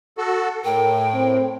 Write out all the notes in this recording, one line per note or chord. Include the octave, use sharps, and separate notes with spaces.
F#4 A4
A2 A#4 G5
C4